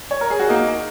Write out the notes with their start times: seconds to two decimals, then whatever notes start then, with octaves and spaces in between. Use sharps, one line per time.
0.11 C#5
0.21 A#4
0.30 G#4
0.40 F#4
0.49 A#3 D#4